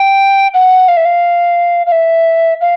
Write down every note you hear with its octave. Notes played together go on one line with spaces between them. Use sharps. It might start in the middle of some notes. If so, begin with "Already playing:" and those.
Already playing: G5
F#5
F5
E5
F5
F5
E5
F5